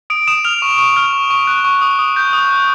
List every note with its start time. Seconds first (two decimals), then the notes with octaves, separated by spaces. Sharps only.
0.10 D#6 D7
0.27 D#6 E7
0.45 F6 F7
0.62 C#6
0.78 C#6
0.97 F6
1.13 C#6
1.30 C#6
1.47 F#6
1.65 C#6
1.81 D#6
1.99 D#6
2.16 G6
2.33 D#6
2.50 F#6